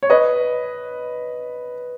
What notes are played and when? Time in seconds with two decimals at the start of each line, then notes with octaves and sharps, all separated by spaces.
0.03 C#5
0.10 B4 D#5